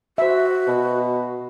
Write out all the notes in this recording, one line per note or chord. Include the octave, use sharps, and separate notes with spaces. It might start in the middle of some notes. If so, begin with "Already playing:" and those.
F#4 C5 E5
B2